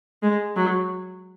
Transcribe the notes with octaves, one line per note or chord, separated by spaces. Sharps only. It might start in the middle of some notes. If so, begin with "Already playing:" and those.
G#3
F#3